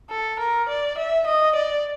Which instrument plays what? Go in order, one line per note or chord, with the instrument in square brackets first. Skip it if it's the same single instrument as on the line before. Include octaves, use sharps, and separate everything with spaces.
[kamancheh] A4
A#4
D5
E5
D#5
D5